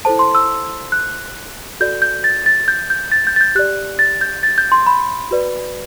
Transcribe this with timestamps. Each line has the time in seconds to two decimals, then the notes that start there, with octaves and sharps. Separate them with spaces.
0.05 E4 A4 C5 A5
0.19 C6
0.35 E6
0.92 F#6
1.80 F#4 A4 D5 G6
2.02 G6
2.24 A6
2.46 A6
2.68 G6
2.90 G6
3.12 A6
3.27 G6
3.36 A6
3.41 G6
3.55 G4 D5 F#6
3.99 A6
4.21 G6
4.43 A6
4.58 G6
4.72 C6
4.87 B5
5.31 F#4 B4 D5